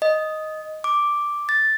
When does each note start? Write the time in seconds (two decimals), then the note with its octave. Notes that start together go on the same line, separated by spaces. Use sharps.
0.02 D#5
0.84 D6
1.49 A6